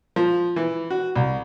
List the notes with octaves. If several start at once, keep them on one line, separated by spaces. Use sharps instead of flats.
F3
E3
F#4
C2